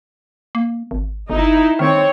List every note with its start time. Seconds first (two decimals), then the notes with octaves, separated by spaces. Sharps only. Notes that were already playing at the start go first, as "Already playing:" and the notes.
0.55 A#3
0.91 G#1
1.30 G1 D#4 E4
1.79 D#3 C4 C#5